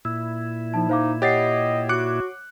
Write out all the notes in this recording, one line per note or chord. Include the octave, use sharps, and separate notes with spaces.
A#2 E4 E6
F3 D#4 A5
D#4 C5 F5 D6
G4 C#5 D#5 F#5 A6 C7
F#4 D6 F#6 C#7